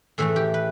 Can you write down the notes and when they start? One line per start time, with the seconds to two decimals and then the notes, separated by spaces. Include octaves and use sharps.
0.18 A2 E3 A3 A4
0.36 G4
0.54 B4